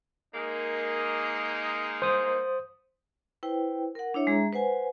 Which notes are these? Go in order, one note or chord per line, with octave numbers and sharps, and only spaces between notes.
G#3 A#3 D#4
C5 D#6
E4 B4 C5 G5
A#4 F#5
D4 E4 C#5 E5
G#3 G#4 E5 A#5
B4 C5 F#5 G#5